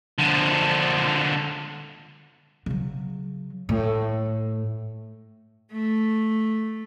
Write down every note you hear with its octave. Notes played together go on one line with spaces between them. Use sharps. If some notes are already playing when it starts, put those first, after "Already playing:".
D3 F3
C#3 F#3
A2
A3